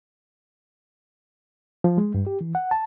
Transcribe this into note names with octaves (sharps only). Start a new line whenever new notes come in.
F3
G#3
G2
G4
E3
F#5
A5